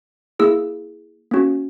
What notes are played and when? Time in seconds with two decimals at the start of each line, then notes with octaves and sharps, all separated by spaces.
0.39 A#3 E4 G#4 E6
1.31 A#3 C#4 F#4